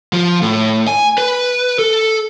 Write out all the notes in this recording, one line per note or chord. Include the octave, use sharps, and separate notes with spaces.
F3
A2
G#5
B4
A4